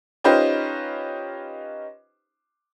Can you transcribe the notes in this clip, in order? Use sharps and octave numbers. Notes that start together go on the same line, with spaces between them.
C#4 D#4 F4 G4 B4 C5